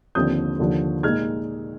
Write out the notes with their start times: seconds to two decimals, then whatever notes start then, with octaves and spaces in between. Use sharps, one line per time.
0.15 D#2 D3 F3 C4 D#6 G6
0.59 D#2 D3 F3
1.03 A#2 G#3 D#4 F6 G#6